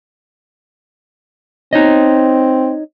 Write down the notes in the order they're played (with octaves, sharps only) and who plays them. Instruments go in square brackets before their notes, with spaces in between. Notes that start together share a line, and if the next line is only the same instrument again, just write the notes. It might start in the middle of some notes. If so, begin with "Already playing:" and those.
[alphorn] C4 [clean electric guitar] D#4 C#5 D#5